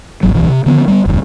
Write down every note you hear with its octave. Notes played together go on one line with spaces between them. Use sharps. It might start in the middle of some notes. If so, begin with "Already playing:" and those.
D1 G#1 F#3
D1 B1 E3
C3
D3 D#3 F3 B3
G3 G#3 B3
F1 D2 G2